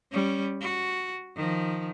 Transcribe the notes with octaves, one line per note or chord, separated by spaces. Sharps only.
G3 C#4
F#4
D#3 F3